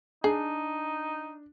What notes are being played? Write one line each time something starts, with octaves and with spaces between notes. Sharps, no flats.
D4 D#4 G#4